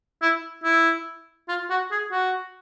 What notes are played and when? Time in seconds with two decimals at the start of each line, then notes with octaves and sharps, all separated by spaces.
0.22 E4
0.64 E4
1.49 F4
1.70 F#4
1.91 G#4
2.12 F#4